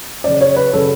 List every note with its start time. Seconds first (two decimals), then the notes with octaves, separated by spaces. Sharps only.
0.24 C#3 F#3 C#4 D5
0.41 C#5
0.56 B4
0.73 C#3 F#3 C#4 A4